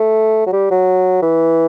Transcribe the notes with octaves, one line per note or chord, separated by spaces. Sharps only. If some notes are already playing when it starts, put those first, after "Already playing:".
Already playing: A3
F#3
G3
F#3
E3